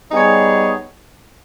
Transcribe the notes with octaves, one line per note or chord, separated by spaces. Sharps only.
G3 B3 D#4 G#4 C#5